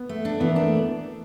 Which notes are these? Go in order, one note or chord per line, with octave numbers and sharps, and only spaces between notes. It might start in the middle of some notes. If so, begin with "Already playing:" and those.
Already playing: B3
A3
D4
E3 B3
A#3
A3 D4